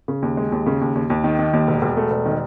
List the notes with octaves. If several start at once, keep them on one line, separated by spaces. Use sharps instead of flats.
C#3
D#2
G#3
D#2
C#3
D#2
D#2
D#2
D#3
D#3
D#2
E1
E1
A3
E1
D#3